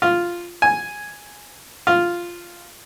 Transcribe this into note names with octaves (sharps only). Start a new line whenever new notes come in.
F4
G#5
F4